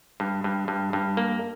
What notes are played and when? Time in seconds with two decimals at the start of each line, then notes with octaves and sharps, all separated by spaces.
0.20 G2
0.44 G2
0.68 G2
0.93 G2
1.17 A#3